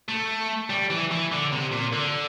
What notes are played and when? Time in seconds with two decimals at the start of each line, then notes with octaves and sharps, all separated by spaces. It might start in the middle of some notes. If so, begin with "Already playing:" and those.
0.09 A3
0.70 G3
0.90 E3
1.11 E3
1.32 D3
1.52 C3
1.72 A#2
1.93 D3